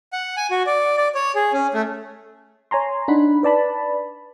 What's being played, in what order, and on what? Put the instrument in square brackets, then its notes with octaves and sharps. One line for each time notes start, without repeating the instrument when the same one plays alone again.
[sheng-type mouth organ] F#5
G#5
F#4
D5
D5
C#5
G#4
C#4
A3
[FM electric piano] C#5 G#5 A#5 C6
D4 D#4 F#5 B5
B4 D5 A5 B5